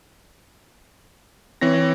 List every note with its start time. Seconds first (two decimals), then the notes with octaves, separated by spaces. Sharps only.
1.61 E3 C4 C#5 A#6